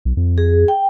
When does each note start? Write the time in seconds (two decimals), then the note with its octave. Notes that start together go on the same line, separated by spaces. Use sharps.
0.05 B1
0.17 F2
0.38 G#4
0.68 G5